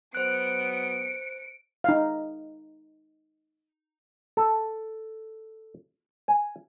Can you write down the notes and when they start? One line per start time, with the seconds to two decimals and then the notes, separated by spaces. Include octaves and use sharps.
0.15 F#3 B3 C5 F#6 C#7 D7
1.84 D#4 F5
4.37 A4
6.28 G#5